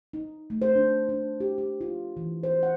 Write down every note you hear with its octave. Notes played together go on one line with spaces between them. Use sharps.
D#4
A3
C5
D4
D4
G4
G4
F4
E3
C5
F#5